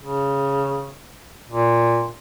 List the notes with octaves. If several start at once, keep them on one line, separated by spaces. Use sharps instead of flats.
C#3
A#2